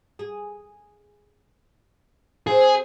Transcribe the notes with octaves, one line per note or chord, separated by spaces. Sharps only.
G#4
C4 G#4 C5 F5